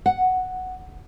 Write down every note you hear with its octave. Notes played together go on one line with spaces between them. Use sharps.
F#5